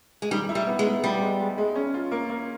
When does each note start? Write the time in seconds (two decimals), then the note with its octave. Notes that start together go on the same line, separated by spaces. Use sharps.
0.22 G#3
0.31 D#3 G3
0.49 E4
0.55 G3
0.67 B3
0.79 G#3
0.85 E4
1.04 G3 B3
1.21 G#3
1.39 G#3
1.58 G#3
1.76 C#4
1.94 F4
2.12 A#3
2.30 A#3